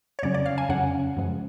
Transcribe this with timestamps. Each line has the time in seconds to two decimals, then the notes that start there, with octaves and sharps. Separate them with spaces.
0.19 C#5
0.23 F2 C#3 F#3 C#4 D5
0.34 D5
0.46 F5
0.58 G#5
0.69 F2 C#3 F#3 C#4 F#5
1.17 F#2 C#3 F3 G#3